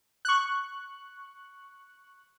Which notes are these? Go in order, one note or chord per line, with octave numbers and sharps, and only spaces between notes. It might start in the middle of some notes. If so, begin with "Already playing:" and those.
C#6 F#6